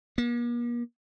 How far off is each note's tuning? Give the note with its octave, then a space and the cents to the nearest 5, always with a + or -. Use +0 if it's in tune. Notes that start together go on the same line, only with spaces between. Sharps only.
A#3 +45